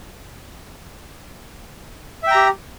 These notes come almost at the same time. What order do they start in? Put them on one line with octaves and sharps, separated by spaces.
E5 G5 A#5 G4